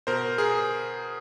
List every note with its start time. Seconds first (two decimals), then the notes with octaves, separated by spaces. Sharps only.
0.07 B2 A#4 C5
0.38 G#4 A#4